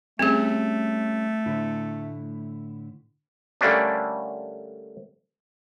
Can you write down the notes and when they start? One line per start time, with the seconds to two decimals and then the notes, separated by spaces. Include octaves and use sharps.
0.19 G3 A3 C4 C#4 G#4
1.46 A2 D3 E4
3.61 D3 G3 A3 A#3 C#4 D4